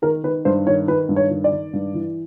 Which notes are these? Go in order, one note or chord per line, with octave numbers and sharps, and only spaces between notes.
D#3 A#4
D#3 B4
G2 C5
D#3 C#5
D#3 B4
G2
C#5
D#3
D5
D#3
G2
E3